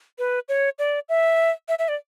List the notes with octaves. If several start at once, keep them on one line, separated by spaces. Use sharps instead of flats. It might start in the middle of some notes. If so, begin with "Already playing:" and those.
B4
C#5
D5
E5
E5
E5
D5